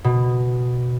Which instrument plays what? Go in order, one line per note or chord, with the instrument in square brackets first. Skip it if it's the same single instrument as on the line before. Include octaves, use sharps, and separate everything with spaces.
[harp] B2